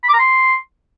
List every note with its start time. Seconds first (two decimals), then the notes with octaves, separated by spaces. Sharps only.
0.04 B5
0.09 D6
0.14 A#5
0.19 C6